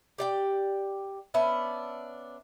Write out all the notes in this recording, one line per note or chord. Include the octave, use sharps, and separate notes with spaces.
G4 D5 G5
B3 C#4 D4 E5